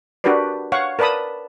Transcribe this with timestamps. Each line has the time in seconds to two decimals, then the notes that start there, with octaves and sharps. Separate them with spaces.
0.24 D4 F#4 G4 A#4 B4 D5
0.72 C#5 F5 F#5 C#6
0.99 A#4 B4 D5 A5 B5 D#6